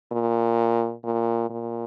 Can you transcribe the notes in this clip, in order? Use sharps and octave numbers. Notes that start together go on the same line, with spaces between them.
A#2
A#2
A#2